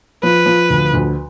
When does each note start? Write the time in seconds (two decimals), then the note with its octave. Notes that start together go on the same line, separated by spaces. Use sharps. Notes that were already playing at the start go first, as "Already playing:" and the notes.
0.23 F3 B4
0.46 F3
0.70 D2
0.94 D2